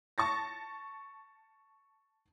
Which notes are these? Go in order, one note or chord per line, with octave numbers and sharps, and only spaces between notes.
A5 C#6 A6 A#6